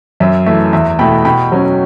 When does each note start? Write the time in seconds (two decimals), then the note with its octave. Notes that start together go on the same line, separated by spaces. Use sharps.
0.20 F#2 E5
0.46 E3 A3 E5
0.73 E2 E5
0.99 B2 A3 E4 G5 B5
1.25 B2 G5 B5
1.52 F#3 C#4